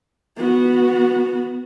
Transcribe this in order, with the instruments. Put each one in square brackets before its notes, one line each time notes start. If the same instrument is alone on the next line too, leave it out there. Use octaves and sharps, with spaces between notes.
[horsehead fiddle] B3 F#4